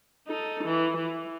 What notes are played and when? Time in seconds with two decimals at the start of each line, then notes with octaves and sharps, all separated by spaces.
0.28 D#4 A4
0.64 E3
0.97 E3